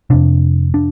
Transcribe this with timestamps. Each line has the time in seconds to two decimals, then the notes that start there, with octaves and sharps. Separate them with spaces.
0.10 F2 C3 D4
0.74 D4